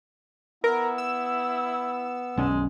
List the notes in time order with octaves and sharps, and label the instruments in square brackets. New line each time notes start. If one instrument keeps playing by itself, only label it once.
[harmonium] B3 [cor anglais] E4 [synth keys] A#4
[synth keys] E6
[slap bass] B1 C#4 [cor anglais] G#3